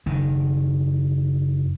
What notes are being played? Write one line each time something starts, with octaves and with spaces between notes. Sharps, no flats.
F#1 D#3